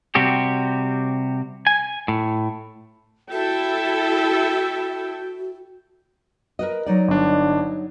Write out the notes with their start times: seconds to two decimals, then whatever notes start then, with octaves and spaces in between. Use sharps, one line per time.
0.15 C3 G3 C4 F#4 G4
1.67 G#5
2.08 A2
3.32 E4 F#4 A4 E5 G5
6.59 A#4 B4 D#5
6.86 F#3 D#4 D5
7.08 G1 D4